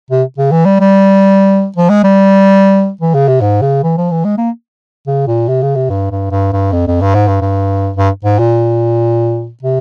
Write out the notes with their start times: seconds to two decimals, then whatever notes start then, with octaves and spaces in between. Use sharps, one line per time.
0.10 C3
0.38 C#3
0.51 E3
0.65 G3
0.80 G3
1.76 F3
1.89 G#3
2.04 G3
3.01 E3
3.14 C#3
3.28 C3
3.41 G#2
3.62 C#3
3.83 E3
3.97 F3
4.11 E3
4.24 G#3
4.38 A#3
5.07 C#3
5.27 A#2
5.48 C3
5.62 C#3
5.76 C3
5.89 G2
6.11 G2
6.31 G2
6.52 G2
6.72 F2
6.87 F2
7.01 G2
7.14 G#2
7.27 G2
7.41 G2
7.96 G2
8.24 G#2
8.39 A#2
9.63 C3